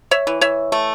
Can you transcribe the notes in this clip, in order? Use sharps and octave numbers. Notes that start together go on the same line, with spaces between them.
C#5 E5
E3
C#5 E5
A3